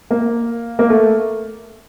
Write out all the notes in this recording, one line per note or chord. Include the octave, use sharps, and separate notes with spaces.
A#3
A#3
A3